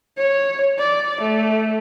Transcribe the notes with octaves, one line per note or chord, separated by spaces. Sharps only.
C#5
D5
A3